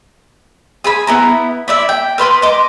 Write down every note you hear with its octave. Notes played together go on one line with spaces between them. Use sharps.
G#4 G#5 B5
B3 E4 A#5
E4 D5 E5
G5
A#4 B4 C6 D#6
D#5 C6 D6